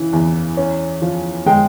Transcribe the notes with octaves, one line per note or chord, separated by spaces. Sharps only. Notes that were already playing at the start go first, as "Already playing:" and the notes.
Already playing: C#3 E3
E2
C#4
F3
G#3 G5